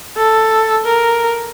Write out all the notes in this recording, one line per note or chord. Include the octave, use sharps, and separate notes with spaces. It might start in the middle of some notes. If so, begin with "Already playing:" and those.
A4
A#4